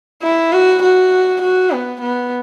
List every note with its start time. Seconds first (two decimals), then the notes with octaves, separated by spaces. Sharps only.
0.22 E4
0.53 F#4
0.83 F#4
1.42 F#4
1.72 B3
2.02 B3